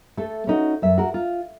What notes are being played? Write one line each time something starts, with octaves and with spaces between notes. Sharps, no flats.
A3 A4
C#4 D#4 F#4
F#2 E5
F#4 A#4
F4